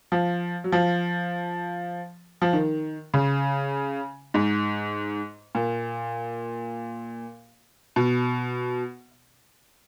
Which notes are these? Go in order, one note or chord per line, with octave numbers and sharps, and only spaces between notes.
F3
F#3
F3
F3
D#3
C#3
G#2
A#2
B2